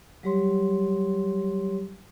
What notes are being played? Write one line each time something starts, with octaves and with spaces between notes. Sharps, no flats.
F#3 G3 G4 C#5 C6